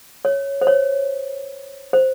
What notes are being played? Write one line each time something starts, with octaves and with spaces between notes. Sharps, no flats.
C#5
C5
C#5
C5